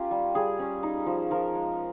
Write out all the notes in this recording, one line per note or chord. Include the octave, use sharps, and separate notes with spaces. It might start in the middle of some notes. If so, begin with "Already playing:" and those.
Already playing: C#4 F4 G4 A#4
G3
G3 G#4
C#4
D#4
F3
F3 A#4
G#3